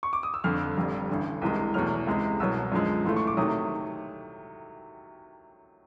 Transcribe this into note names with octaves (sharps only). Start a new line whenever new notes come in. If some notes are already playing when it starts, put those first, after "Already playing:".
C#6
D6
D#6
E6
F1 F2 D3 F6
F1 F2 D3 G3
A1 G2 D3
C2 C3 E3 G#3
E2 B2 F#3 A3 F6
C#2 C3 E3 G#3
C2 B2 F#3 E6
F#2 D3 F3 G#3
A#1 A2 E3 A3 C6
C#6
D6
C3 D#3 F#3 A3 D#6